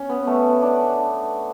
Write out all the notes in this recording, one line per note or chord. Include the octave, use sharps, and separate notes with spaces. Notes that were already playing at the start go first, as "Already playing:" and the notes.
Already playing: C#4
B3
A3
D4